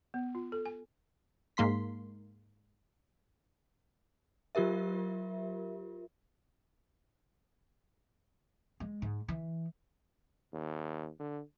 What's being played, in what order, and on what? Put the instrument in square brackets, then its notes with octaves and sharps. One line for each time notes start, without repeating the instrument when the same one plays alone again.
[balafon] B3
F4
A4
G#5
[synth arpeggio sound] G#2 A#3 C6 B6
[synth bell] F#3 F4 G4 A#4 E5
[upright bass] G#3
G#2
E3
[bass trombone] D#2
D3